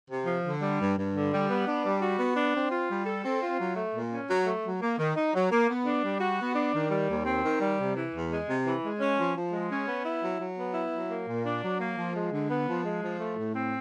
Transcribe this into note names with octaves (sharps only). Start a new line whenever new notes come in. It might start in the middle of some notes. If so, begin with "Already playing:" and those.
C3
F3
D3
G3
G2
G2
D3
G3
B3
D4
G3
F#4
B3
D4
C4
F4
G3
A4
C4
F4
F#3
A3
A#2
C#4
F#3
A3
F#3
A#3
D#3
D#4
F#3
A#3
B3
D4
G3
F#4
B3
D4
D#3
G3
D#2
C4
D#3
G3
C3
E3
E2
G#3
C3
E3
G#3
C#4
F3
F3
G#3
C#4
B3
E4
F#3
F#3
B3
E4
F#3
A#3
A#2
D4
F#3
A#3
F3
G#3
D3
B3
F3
G#3
F3
A3
A2
C4